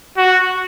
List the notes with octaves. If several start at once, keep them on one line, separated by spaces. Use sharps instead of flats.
F#4